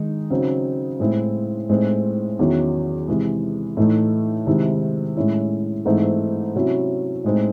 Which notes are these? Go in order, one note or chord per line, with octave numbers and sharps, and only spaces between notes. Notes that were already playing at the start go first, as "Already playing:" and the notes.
Already playing: D#3 G#3 D#4
C#3 F#3 C4 D#4
A2 G#3 C4 E4
A2 G#3 C4 D#4
E2 D#3 F#3 C#4 E4
C3 E3 G#3
A2 E3 A3 D#4
C3 D#3 G#3 C4 E4
A2 G#3 C#4 E4
G#2 E3 A3 C4 D#4
C3 F#3 C#4 E4
A2 G#3 C4 D#4